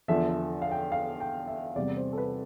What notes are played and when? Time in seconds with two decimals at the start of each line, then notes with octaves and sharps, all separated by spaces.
0.08 E2 D3 F3 E5
0.29 E5
0.62 F5
0.71 G5
0.92 F5
1.20 G5
1.48 E5
1.76 E2 C3 G3 D5
1.97 C5
2.13 A4
2.18 B4